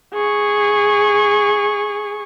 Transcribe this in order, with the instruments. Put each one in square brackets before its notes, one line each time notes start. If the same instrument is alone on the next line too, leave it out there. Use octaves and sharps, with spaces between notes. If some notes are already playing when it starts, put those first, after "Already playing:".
[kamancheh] G#4 C#6